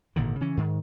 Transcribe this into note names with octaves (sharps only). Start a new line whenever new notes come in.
G#1 A#2 D3 D#3
C#3 E3 C#4
G#2 D#3